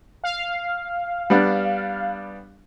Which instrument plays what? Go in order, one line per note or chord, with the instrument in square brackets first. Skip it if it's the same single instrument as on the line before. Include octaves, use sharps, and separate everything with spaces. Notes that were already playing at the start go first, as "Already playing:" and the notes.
[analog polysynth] F5
[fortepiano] G3 B3 D4